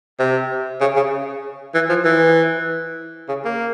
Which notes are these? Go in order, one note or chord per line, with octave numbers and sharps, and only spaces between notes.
C3
C#3
C#3
E3
F3
E3
C#3
A#3